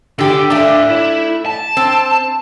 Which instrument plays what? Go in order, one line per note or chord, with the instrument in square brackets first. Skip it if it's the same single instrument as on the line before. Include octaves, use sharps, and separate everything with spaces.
[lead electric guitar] D2 G5 [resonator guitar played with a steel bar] D3 G4
[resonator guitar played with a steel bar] A3 D4 [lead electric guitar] D5 F5
[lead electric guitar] E4
A5
[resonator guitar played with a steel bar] C4